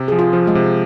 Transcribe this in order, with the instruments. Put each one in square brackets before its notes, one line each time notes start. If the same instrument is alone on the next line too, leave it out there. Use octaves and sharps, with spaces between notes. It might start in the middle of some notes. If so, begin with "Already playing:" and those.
Already playing: [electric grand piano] C3
[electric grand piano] F3 [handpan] G#4
[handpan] F4
[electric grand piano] F3
[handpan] G#3
[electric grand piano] C3